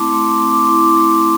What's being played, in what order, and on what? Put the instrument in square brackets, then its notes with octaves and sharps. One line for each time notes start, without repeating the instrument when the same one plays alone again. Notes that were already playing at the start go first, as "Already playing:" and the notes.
Already playing: [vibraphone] A3 C4 E4 A5 C6 D6
A3 C6
D6
C4 C6
D6
E4 C6
D6
C6
A3
D6
C6